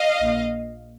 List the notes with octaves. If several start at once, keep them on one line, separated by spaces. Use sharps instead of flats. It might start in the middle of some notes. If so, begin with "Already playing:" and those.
Already playing: D#5 F5
A#1 A#2